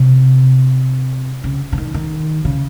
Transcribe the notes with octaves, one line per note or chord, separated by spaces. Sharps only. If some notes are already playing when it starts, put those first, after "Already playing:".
Already playing: C3
C#3
C#3
D#3
D#3
C#3